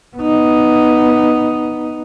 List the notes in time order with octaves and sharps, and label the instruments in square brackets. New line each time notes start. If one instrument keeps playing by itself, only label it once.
[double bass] B3 D#4